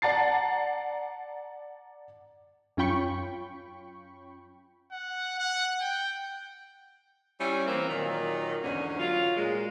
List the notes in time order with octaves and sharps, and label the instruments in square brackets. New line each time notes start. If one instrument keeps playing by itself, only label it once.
[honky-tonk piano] D5 F#5 A5 A#5 A6 C7
[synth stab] F#2 C#4 F4 G5 B5 C#6
[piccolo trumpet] F#5
F#5
G5
[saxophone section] G3 C#4 E4
E3 A#3 C4
A#2 D#3 F#3 F4
E2 G#2 D3 C#4
F#3 F4
A#2 G#3